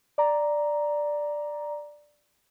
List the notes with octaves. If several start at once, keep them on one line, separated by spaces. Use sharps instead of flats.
D5 A#5